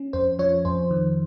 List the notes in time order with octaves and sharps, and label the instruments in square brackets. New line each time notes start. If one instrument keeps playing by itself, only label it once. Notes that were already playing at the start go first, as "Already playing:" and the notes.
Already playing: [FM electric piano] C#4
F2 C5
F3 C#5
F2 C5
D#3